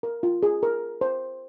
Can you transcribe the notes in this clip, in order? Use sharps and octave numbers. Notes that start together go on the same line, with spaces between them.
A#4
F4
G#4
A#4
C5